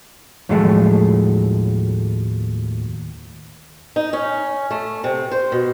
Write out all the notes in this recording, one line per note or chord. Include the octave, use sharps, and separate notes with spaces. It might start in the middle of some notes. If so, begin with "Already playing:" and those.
D#2 A2 F3 F#3 G#3 A3
D#4
C#4
A3
C3
C5
B2